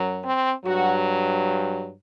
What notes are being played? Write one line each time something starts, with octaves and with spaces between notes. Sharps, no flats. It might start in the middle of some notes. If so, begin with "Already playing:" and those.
Already playing: F#2 F#3
C4
G2 F#3 F#4